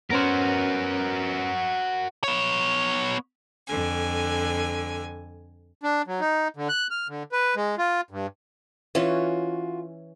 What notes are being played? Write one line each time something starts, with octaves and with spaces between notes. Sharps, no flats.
B3 C#4 F#4 A#4 C5
B3 C#5
F2 D3 G#5
D4
F#3
D#4
D3
F#6
F6
D3
B4
G#3
F4
G2
E3 C#4 F4 F#4